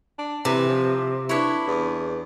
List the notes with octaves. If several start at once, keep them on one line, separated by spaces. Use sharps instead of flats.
D4
C3 E3
F3
D4 E4 B4 C#5
E2